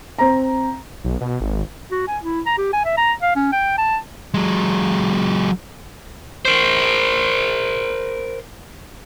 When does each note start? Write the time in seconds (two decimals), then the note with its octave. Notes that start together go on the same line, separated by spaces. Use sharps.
0.18 C4 A#5
1.04 B1
1.21 B2
1.41 G#1
1.91 F#4
2.08 G#5
2.24 E4
2.46 A#5
2.58 G4
2.73 G#5
2.85 E5
2.98 A#5
3.22 F5
3.36 C#4
3.52 G5
3.78 A5
4.34 F#3 G#3
6.45 A#4 C5